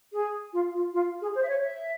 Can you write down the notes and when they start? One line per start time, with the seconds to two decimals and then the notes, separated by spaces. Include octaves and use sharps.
0.12 G#4
0.52 F4
0.73 F4
0.93 F4
1.21 G#4
1.35 C5
1.42 E5
1.48 C#5
1.61 E5